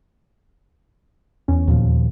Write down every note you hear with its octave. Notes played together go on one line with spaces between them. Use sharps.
E2 C#4
D#2 A#2 F3